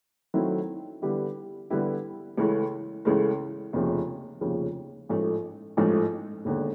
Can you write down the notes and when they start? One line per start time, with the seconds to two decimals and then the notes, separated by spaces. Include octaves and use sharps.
0.34 D#3 F#3 A3 C4 E4
1.02 D3 G3 B3 E4 G4
1.70 D3 G3 B3 E4 G4
2.38 C#2 C#3 E3 A3
3.05 C#2 C#3 E3 A3
3.73 F1 D#2 C#3 F3
4.41 F1 D#2 C#3 F3
5.09 A1 G#2 F3 A3
5.77 A1 G#2 F3 A3
6.45 E1 D#2 D3